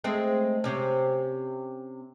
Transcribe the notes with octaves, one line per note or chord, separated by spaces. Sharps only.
G#3 A3 C4
C3 C#4